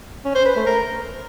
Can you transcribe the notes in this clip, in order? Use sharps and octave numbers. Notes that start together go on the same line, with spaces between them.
C#4
C5
B4
A3
A#4